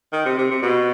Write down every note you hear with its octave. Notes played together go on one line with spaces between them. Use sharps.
D#3
C3
C3
C3
B2